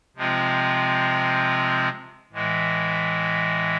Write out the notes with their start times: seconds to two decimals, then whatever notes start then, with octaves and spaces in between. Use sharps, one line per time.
0.16 C3 F3 G#3 C4 F4
2.33 A2 E3 G#3